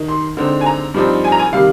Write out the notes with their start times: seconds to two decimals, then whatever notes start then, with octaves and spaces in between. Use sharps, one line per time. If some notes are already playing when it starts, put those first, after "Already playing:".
Already playing: D#3 D#4
0.08 C6
0.37 D3 G#3 C4 D#4
0.61 G#5
0.66 A#5
0.94 G2 F3 C4 D#4
1.24 G#5
1.32 A#5
1.39 G#5
1.52 C3 D#3 G3 F5